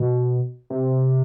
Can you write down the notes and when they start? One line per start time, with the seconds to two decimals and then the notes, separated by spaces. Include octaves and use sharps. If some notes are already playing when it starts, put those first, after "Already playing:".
Already playing: B2
0.70 C3